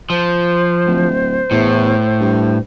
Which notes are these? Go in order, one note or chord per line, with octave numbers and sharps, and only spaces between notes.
F3 C5
D1
E2 A2
G2